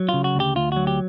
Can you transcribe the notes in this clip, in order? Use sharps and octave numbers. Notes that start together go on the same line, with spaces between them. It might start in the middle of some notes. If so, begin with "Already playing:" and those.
Already playing: F#3
C#3 F4
F#4
D2 G4
D2 F4
F#3 F#4
G4